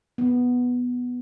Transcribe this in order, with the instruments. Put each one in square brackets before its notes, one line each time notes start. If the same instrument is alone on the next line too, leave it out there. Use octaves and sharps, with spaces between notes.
[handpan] B3